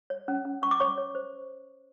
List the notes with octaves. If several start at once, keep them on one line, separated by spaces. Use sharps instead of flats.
C#5
C#4
C#4
C#4 C#6
D6
C#5 C#6
C#5
C5